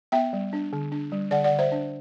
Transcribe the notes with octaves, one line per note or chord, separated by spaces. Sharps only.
B3 E5 G5
G3
D4
D3
D4
G3
D3 D5 F#5
D5 F#5
D3
C5 E5
D4